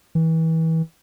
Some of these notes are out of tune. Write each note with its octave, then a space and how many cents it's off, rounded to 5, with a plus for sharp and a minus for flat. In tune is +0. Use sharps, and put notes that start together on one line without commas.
E3 -30